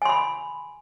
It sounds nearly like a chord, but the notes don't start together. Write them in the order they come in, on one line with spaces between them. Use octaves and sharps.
G#5 C6 B5